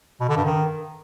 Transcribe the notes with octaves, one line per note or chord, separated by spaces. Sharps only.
B2
D3
G2
D#3